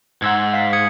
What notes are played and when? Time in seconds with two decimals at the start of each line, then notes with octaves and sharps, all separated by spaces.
0.22 G#2 F#5 E6 G#6
0.54 F5 B6
0.73 D#6 G#6 C#7